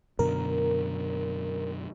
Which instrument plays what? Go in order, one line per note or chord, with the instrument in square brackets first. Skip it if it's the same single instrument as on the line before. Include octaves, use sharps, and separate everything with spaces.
[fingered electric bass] F#2 B2 D3 [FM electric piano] A#4